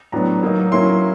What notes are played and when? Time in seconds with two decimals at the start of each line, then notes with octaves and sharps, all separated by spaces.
0.12 A2 F#3 B3 D4 A#5
0.43 F#3 A#3 D#4
0.72 F#3 A#3 C#4 E4 C6